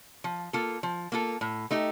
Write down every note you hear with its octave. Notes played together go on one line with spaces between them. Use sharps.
F3
A#3 F4 A4
F3
A#3 F4 A4
A2
A3 D#4 G4